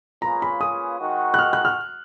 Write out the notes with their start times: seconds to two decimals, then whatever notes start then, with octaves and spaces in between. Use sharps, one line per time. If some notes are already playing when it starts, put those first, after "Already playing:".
0.22 A#3 C#4 F4 G#4 B4 A#5
0.42 B5
0.61 D#6
1.00 D#3 G#3 D#4 F#4
1.34 F#6
1.39 F6
1.53 F#6
1.65 F6